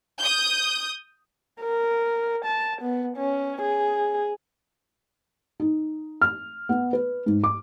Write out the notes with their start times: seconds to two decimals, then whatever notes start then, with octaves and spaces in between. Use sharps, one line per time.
0.19 D#6 G6
1.61 A#4
2.45 A5
2.82 B3
3.17 C#4
3.62 G#4
5.60 D#4
6.22 F6
6.69 B3
6.93 B4
7.26 G#2
7.44 D6